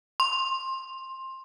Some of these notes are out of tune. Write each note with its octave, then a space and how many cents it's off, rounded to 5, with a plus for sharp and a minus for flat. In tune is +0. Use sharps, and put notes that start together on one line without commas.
C6 +20